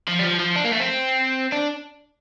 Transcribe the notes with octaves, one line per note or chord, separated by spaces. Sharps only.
F3
G3
F3
F3
D4
A#3
A3
C4
D4